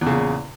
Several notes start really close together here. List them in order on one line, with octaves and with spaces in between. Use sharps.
E2 C#3 A#2